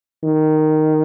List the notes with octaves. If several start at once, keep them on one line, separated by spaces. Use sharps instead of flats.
D#3